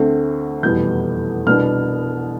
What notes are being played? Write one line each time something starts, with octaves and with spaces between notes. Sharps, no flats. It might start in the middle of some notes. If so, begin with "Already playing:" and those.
Already playing: D2 D3 A3 C4
F1 E2 B2 G3 B3 G6
C2 B2 B3 D4 F6